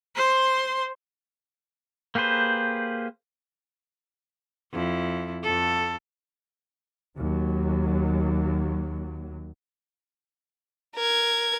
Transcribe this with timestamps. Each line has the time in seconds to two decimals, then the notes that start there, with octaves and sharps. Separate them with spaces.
0.15 C5 C6
2.15 A#3 G4 G#4 B4 C5
4.73 F2 E4
5.43 F2 A4
7.17 D#2 F#3
10.95 A#4 G#6